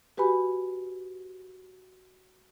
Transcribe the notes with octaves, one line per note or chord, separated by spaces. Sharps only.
F#4 G4 B4 G#5 B5